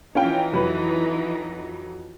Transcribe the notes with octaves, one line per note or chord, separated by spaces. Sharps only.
E3 C#4 D#4 F4 G5
F2 F#3 B4